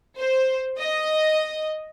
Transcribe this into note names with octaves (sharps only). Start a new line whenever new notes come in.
C5
D#5